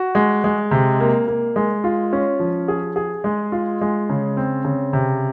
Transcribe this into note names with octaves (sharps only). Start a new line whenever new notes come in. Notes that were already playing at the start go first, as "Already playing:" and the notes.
Already playing: F#4
G#3
G#3
C3
A#3
A#3
G#3
F4
C#4
F3
G#4
G#4
G#3
F4
G#3
C#3
C4
C#3
C3